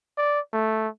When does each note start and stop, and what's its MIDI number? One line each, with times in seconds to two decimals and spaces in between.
0.18 0.40 74
0.53 0.88 57